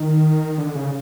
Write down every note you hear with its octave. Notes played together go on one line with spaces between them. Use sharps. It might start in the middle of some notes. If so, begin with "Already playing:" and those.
Already playing: D#3
D3
C#3